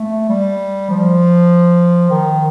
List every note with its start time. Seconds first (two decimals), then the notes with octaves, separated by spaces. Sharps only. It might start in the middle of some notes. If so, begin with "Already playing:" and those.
Already playing: A3
0.29 G3
0.90 F3
2.10 D#3